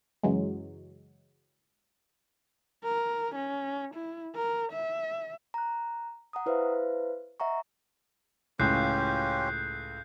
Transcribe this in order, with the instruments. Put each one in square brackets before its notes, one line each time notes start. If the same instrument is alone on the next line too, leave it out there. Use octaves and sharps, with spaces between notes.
[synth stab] F#2 C#3 E3 F#3 G#3
[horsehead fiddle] A#4
C#4
E4
A#4
E5
[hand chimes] A#5 F#6
F#5 A#5 D#6
E4 B4 C5 E5 F5
D#5 E5 F#5 A#5 C#6
[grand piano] C#2 A2 [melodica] C#4 F4 G4 [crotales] F#6 G6 C7